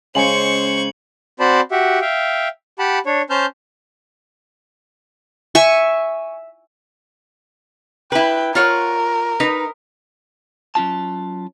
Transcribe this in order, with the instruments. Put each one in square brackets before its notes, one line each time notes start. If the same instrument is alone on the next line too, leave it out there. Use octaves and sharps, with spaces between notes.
[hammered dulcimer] C#3 G#3 G#5 [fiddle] C5 C#6 [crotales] C#7 F#7
[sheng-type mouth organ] C4 F#4 C5 D5 A5 B5
F#4 G4 E5 F#5
E5 F5 G5
G4 F#5 A5 B5
D4 C#5
C#4 C5 A5 F6 G6
[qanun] E5 G#5 C#6
[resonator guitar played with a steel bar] E4 B4 [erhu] G5
[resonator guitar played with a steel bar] F4 C#5 F#5 [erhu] A#4
[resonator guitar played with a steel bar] D#4 B4
[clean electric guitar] F#3 C#4 F4 A5